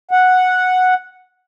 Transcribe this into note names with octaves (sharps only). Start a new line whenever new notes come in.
F#5